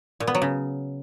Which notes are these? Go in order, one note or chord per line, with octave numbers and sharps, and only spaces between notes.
A#2
B3
F#3
C#3